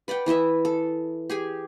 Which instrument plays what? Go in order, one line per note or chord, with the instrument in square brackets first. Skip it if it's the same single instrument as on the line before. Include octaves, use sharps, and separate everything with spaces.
[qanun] B4 D5 F#5 G5
E3 E4 D#5 E5
A4
G4 G#4 G#5